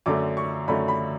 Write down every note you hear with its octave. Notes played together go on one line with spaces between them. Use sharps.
F#2 D3 A3 D6
C#6
F#2 D3 A3 B5
B5